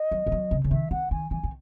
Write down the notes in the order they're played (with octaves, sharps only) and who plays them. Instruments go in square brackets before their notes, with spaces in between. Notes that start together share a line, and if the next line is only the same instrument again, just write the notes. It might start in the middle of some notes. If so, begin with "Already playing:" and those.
Already playing: [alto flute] D#5
[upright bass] F#3
E3
F#3
C#3
C#3
[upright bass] D#3 [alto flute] E5
[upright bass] D#3 [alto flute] F#5
[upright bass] D#3 [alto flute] G#5
[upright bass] E3 [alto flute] G#5
[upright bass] D#3